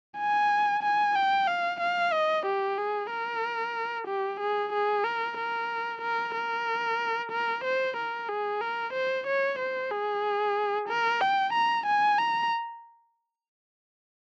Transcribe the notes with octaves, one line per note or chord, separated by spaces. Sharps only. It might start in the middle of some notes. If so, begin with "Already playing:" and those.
G#5
G#5
G5
F5
F5
D#5
G4
G#4
A#4
G4
G#4
G#4
A#4
A#4
A#4
A#4
A#4
C5
A#4
G#4
A#4
C5
C#5
C5
G#4
A#4
G5
A#5
G#5
A#5